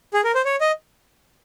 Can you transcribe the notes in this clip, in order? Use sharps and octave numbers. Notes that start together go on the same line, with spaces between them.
G#4
A#4
C5
C#5
D#5